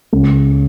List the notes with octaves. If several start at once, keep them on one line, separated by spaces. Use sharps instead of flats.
C#2